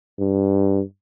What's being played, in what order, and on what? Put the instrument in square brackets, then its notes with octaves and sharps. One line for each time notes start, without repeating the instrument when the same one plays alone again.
[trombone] G2